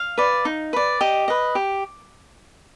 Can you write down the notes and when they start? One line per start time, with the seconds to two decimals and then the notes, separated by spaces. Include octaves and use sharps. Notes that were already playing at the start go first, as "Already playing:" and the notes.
Already playing: F5
0.18 B4 D5
0.45 D#4
0.73 B4 D5
1.01 G4 D#5
1.28 B4 D#5
1.55 G4